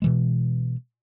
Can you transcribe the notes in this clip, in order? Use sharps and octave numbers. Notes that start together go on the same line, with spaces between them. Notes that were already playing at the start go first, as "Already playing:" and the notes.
B2 E3 G#3